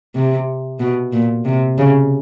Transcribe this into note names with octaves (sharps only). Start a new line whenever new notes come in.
C3
B2
A#2
C3
C#3